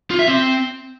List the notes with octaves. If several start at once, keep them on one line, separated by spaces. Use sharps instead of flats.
F4
E5
C4